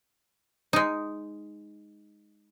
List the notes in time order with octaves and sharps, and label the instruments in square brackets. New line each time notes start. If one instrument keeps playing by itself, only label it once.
[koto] G#3 D#4